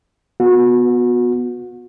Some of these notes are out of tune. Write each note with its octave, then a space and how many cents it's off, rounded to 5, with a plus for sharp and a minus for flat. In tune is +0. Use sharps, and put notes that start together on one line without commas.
B3 +0 F#4 -30